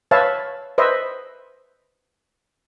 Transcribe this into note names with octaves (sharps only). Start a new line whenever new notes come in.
B4 C#5 E5 F5 A5
B4 C5 D#5 E5